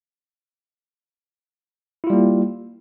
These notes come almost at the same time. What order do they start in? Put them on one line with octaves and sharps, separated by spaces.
E4 F4 G3 A#3